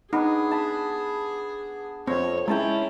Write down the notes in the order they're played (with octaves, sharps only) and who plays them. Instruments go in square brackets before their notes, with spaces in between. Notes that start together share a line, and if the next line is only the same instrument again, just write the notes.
[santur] B3 D4 [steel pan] D#4 [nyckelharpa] G#4
[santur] A5 B5
[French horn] F2 [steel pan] C4 [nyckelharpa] C#5
[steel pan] G#3 [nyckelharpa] C#4 [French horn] E4 [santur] G5 A5 A#5